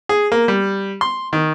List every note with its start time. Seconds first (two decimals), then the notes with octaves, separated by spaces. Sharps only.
0.09 G#4
0.32 A#3
0.48 G3
1.01 C6
1.33 D#3